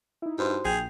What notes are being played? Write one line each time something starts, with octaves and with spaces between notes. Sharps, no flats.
D#4 E4
G2 F#4 C5 C6
A#1 G#4 G5 G6 F7